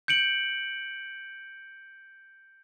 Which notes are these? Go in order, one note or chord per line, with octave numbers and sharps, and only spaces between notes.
G6 C#7 D7 F#7